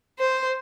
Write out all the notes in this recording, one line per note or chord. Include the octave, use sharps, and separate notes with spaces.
C5